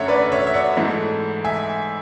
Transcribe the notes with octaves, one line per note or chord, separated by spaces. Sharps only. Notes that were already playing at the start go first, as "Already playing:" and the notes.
Already playing: F#2 D3 A3 C#5 E5 F#5
B4 D5
C#5 E5
E5
D5 F#5
G#2 E3 A3
E5 G#5